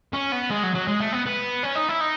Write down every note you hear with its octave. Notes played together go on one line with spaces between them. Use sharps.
C#4
B3
G#3
F#3
F#3
G#3
A3
B3
B3
C#4
D#4
E4
D#4